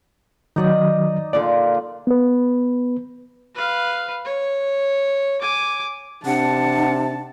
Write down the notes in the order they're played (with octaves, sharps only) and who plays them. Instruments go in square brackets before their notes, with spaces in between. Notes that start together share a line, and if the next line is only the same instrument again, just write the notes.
[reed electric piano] D#3 F#3 [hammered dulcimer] D#4 D5 D#5
[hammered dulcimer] A#2 D3 F4 [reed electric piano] D5
[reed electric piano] B3 B4
[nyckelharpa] B4 F5
C#5
G#5 D6
[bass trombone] C3 [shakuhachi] D4 [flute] F#5 [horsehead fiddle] A5